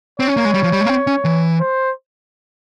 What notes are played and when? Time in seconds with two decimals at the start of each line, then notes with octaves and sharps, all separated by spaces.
0.20 C4 C#5
0.28 C#4
0.37 A#3
0.45 G#3
0.54 G3
0.64 F3
0.72 G3
0.81 G#3
0.85 A#3
0.89 C4
1.07 C#4
1.24 E3
1.60 C5